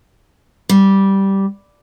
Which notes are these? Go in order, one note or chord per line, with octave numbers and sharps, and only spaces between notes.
G3